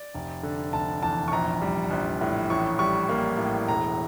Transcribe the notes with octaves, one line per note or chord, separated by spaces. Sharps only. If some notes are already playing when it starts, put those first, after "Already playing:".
Already playing: D5
F1
D3
F1 A5
E2 A5
C#6
A#1 A#5
G3
A#1
A2
A1 C#6
G3 C#6
A#3
A2
E1 A#5